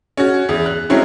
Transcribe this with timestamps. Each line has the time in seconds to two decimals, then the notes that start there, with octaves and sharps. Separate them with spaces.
0.17 C#4 F#4
0.49 E2
0.66 F#6
0.90 F#3 G#3 C4 C#4 E4